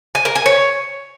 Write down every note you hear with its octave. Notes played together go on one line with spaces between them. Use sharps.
G#5
A#4
G#5
C#5